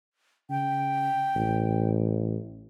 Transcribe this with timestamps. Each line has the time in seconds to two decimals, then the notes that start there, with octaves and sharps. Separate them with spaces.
0.50 C#3 G5
1.36 A1